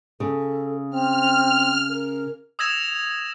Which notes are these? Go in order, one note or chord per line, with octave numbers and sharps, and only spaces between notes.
C#3 A4
C4 F6
A#4
D#6 E6 G#6 A#6 E7 F7